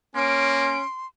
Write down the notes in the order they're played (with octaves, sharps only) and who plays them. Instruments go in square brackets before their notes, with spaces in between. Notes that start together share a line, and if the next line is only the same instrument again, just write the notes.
[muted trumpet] A#3 [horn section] C#4 [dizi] C6 [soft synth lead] D7